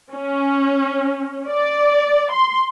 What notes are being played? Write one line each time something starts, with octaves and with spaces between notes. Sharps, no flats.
C#4
D5
C6